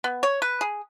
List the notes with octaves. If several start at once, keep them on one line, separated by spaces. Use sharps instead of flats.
B3
C#5
B4
G#4